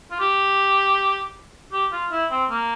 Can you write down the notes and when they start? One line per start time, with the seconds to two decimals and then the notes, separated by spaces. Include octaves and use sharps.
0.11 F4
0.20 G4
1.72 G4
1.92 F4
2.12 E4
2.31 C4
2.50 A#3